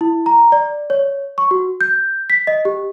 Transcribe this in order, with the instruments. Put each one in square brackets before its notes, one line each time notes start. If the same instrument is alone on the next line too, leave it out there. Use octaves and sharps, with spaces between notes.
[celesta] E4
A#5
D5
C#5
C#6
F#4
G6
B6
D#5
G4